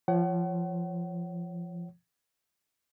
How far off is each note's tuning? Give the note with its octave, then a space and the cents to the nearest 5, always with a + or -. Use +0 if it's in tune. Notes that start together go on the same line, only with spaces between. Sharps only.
F3 -20 C#5 +0 F#5 +35